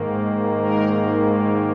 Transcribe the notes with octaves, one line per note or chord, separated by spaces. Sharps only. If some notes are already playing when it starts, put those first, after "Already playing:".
Already playing: G#2 D#3 A#3
A#4